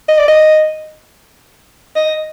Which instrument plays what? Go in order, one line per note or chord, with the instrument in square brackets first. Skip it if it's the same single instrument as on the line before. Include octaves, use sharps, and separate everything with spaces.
[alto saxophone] D#5
D5
D#5
D#5